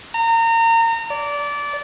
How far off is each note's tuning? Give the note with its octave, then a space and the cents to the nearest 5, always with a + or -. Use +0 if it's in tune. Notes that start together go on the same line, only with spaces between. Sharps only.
A#5 -30
D5 -20